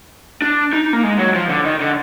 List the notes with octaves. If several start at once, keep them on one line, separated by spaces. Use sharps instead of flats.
D4
D#4
A#3
G#3
F#3
F3
D3
D#3
D3